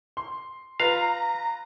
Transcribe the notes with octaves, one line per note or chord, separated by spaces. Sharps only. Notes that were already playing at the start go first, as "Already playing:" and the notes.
C6
F4 B4 F5 A#5